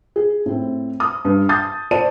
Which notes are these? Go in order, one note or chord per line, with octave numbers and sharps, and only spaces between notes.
G#4
A2 C4
D#6
G2
A5 D#6 G6 A6
C5 D5 A5 D#7